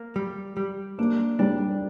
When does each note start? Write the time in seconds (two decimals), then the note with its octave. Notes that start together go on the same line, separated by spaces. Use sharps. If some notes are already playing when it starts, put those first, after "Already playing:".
Already playing: A#3
0.16 G3
0.57 G3
0.98 A#3 D4
1.39 G3 D4